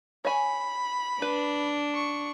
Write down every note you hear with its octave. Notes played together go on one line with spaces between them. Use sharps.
C#5 G#5 B5
D4 B4
C#6